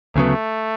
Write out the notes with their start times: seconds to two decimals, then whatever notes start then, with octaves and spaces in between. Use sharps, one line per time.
0.16 D2 C#3 F#3 A3 B3